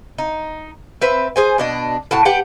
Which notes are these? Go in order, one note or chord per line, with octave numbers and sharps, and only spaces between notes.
D#4
C4 B4 E5
G#4 C5 G#5
B2 D4 D#5
A2 F#4 A5
G4 B4 F#5 G5